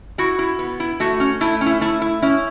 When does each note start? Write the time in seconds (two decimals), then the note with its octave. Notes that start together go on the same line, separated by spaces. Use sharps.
0.18 E4 F#4
0.39 E4
0.59 B3
0.80 E4
1.00 A3 F#4
1.20 C#4
1.41 A3 E4
1.61 C#4
1.66 E4
1.81 A3 E4
2.02 E4
2.22 C#4 E4